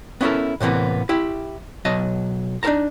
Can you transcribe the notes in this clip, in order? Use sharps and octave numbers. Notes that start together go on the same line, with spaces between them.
B3 C#4 E4 G4 A4 A#4
A2 C3 E3 A#3 B3
E4 G4
B1 F#3 D#5 A5
D4 D#4 F#4 A#4 A5 A#5